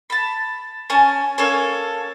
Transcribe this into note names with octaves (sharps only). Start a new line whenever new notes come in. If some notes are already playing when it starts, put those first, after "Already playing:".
A5 B5
C#4 G#5 A5
A#3 C#4 A4 C#5